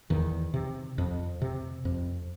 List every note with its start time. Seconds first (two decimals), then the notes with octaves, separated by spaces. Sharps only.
0.10 E2 D#3
0.54 C3
0.98 F2
1.42 C3
1.85 F2